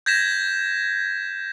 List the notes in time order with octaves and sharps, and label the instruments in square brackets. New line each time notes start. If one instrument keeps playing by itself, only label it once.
[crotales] G6 G#6 A#6 B6 E7